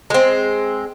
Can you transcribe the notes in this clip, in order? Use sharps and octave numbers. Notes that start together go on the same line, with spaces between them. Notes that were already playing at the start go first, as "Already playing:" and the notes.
G#3 C4